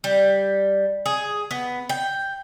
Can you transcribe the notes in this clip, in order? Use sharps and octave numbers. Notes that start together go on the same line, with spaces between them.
G3
G#4
B3
G5